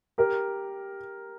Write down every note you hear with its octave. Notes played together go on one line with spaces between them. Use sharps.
G4 A#4